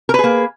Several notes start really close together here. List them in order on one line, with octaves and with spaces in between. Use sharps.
A#4 B4 G#4 A#3